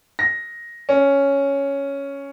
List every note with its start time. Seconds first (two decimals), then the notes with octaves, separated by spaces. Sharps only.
0.19 A#6
0.89 C#4